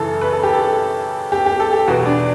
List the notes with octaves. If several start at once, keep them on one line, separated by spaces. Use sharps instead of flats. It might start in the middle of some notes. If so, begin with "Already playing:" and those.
Already playing: F#2 C#3 E3 A4
B4
A4
G4
A4
G4
G4
A4
G4
E2 B2 F#4
D4